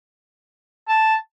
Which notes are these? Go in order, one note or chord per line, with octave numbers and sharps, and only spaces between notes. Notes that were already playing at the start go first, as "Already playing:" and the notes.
A5